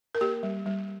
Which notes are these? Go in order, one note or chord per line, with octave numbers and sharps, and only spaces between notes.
A#4
A#3 G4
G3
G3